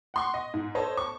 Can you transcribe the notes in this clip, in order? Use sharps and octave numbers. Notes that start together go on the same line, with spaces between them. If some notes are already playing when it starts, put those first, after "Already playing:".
F#5 C6 C#6
D#5
G#2
A4 C5 C#5 D#5 A5
A5 C#6